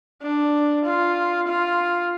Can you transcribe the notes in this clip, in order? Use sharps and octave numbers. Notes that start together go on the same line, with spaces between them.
D4
F4
F4